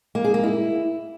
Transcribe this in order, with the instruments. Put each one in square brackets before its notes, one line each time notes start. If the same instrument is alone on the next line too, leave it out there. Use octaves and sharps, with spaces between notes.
[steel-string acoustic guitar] A#3
G#4
A#3
E4